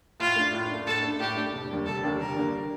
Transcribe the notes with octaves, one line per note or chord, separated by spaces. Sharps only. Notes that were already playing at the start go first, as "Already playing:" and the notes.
A2 F4
A3 D4
A2
A3 D4
A2 A4
A3 D4
A2 G4
A3 D4
F1
D#2 D3 G3 A#3
F1 A4
D#2 D3 G3 A#3
F1 A#4
D#2 D3 G3 A#3